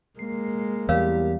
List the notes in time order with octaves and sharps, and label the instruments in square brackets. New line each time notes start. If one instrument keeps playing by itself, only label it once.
[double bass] G#3 A#3 [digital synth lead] C7
[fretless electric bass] E2 G3 [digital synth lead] G4 [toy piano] A#4 C#5 F5